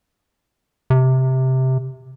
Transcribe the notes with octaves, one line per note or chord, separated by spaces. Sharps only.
C3